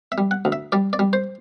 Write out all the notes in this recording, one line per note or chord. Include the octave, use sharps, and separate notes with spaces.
E5
G3
F#5
D2
E5
G3 D5
D5
G3
C5